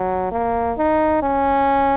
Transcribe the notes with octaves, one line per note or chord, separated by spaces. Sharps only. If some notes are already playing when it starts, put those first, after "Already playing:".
Already playing: F#3
A#3
D#4
C#4